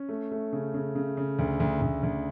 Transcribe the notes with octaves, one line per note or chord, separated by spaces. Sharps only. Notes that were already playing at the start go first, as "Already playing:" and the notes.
Already playing: C#4
A3
A3
C#3
C#3
C#3
C#3
D2
D2
D2
D2